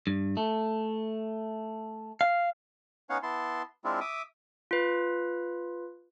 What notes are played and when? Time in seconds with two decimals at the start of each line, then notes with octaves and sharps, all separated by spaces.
0.07 G2
0.37 A3
2.21 F5
3.10 B3 C#4 D#4 C#5 F5 F#5
3.23 B3 E4 A5 C6
3.84 G#3 C4 D4 E4 F4
4.01 E5 D6 D#6
4.71 F4 B4